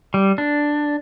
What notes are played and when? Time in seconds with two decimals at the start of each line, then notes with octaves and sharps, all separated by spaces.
0.14 G3
0.38 D4